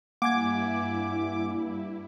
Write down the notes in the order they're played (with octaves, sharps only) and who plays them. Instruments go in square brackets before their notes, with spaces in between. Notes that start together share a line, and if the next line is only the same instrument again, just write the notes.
[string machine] G2 E4 [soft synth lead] A#3 [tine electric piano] F#5 G#5 G#6 [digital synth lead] D6